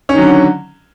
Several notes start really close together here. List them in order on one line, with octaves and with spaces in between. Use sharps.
C#4 D#3 F#3 D3